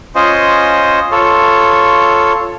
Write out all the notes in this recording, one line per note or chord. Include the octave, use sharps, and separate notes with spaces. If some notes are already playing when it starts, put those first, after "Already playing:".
C#4 F4 C5 D#5
F4 A4 C#5